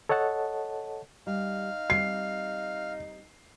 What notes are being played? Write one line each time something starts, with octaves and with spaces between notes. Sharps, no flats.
A4 C#5 D#5 F#5 A5
G3 D#4 F5
G3 C4 C7